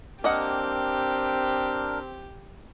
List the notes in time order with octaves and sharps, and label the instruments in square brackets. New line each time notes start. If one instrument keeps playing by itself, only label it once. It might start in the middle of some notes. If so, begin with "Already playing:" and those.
[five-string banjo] A#3 D#5 F#5 [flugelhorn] C4 [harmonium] D4 A#4 [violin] G4